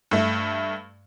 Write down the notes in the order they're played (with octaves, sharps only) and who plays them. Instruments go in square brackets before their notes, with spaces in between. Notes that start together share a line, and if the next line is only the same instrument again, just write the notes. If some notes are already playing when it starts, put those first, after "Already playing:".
[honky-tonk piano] G2 A3